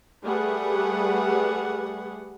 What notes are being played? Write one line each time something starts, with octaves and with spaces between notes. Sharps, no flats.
G3 A3 G#4 B4 F#5